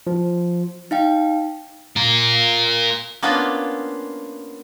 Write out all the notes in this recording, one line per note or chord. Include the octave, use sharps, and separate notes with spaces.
F3
D#4 F5 G5
F4 A#4
A#3 B3 C#4 D4 F4